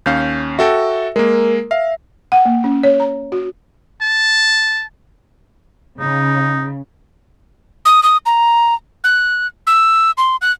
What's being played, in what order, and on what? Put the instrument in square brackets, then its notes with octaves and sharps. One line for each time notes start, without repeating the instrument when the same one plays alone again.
[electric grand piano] D#2 C#4 F5 [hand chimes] G6
[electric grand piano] F#4 A4 G5 [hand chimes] E5
[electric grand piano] G#3 A#3 [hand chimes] A#4
[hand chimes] E5 [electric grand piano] F5
[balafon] F#5
A#3
C#4
C#5
A#5
F#4
[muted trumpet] A5
[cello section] C#3 [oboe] D#4
[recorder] D#6
D#6
A#5
F#6
E6
C6
F#6